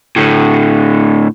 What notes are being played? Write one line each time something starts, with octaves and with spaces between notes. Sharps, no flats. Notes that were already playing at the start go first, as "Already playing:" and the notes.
A2 D3